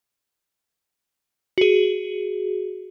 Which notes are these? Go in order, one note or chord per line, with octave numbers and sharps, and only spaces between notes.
F#4 G#4